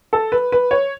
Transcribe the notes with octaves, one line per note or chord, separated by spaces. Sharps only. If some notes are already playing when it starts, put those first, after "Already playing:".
A4
B4
B4
C#5